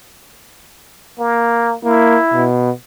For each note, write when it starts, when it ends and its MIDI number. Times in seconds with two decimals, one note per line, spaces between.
1.19 1.75 58
1.85 2.17 58
1.85 2.45 64
2.34 2.71 47